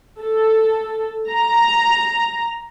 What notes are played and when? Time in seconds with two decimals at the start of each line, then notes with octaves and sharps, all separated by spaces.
0.21 A4
1.31 A#5